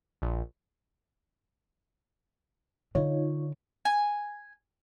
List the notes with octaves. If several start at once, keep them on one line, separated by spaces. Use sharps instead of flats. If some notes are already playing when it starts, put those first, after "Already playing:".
A#1
D3 D#4 F4 C#5
G#5